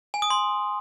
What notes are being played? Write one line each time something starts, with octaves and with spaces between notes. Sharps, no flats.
G#5
D#6
C6